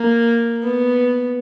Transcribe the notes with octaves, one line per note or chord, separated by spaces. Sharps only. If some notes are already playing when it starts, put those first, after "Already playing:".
Already playing: A#3
B3